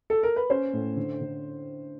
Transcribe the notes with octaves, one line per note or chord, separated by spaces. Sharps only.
A4
A#4
B4
C#4 C5
A2
D3
D3